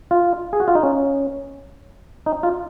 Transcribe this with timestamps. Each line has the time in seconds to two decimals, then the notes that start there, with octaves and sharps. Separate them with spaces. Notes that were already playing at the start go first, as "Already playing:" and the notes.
0.11 F4
0.53 G#4
0.60 F#4
0.68 F4
0.75 D#4
0.83 C#4
2.26 D#4
2.43 F4